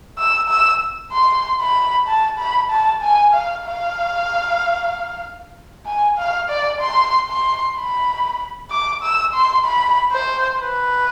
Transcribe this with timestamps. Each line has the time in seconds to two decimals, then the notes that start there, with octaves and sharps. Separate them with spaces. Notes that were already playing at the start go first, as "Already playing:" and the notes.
0.18 E6
0.49 E6
1.12 C6
1.61 B5
2.07 A5
2.38 B5
2.70 A5
3.02 G#5
3.34 F5
3.66 F5
5.86 G#5
6.18 F5
6.49 D5
6.80 C6
7.28 C6
7.76 B5
8.71 D6
9.03 E6
9.34 C6
9.65 B5
10.12 C5
10.60 B4